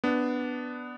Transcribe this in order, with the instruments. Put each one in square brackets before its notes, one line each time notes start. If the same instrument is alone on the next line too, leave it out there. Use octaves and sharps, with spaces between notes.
[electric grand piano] B3 D4